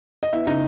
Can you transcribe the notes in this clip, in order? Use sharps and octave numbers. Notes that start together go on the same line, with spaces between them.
D#5
B3 E4 E5
C#3 D#4 D#5